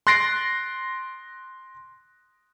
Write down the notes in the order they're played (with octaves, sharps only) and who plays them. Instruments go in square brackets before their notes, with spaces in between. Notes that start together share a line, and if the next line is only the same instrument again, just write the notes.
[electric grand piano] C6 F#6 A6 A#6 C7 D7